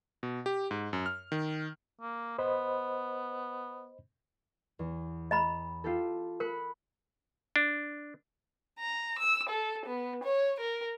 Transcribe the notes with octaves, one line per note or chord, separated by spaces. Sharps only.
B2
G4
G#2
F#2
F6
D#3
A#3
B3 C5 D#5 B5
E2
D#5 A#5 B5
F4 G4 A4
A#4 B5 F#6 C#7
D4
A#5
E6
A4
B3
C#5
A#4